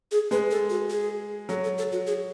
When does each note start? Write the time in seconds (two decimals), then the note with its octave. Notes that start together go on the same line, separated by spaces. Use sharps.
0.12 G#4
0.31 G#3 B4
0.51 A4
0.70 F#4
0.90 G#4
1.49 F#3 A4
1.64 A4
1.78 A4
1.93 F#4
2.07 G#4